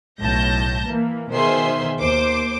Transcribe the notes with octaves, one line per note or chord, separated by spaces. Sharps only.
B1 A2 A5 G6 A#6
E3 A#3
B2 D#3 G#4 C5 E5 C6
D#2 C5 D6